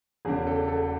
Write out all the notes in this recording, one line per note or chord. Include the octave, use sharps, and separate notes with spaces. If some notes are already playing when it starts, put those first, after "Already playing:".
E1 E2 C#3 G#4
A4
A4